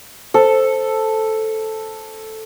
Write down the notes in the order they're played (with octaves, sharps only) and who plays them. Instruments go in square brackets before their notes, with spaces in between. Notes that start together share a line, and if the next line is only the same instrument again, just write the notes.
[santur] A4 [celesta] C5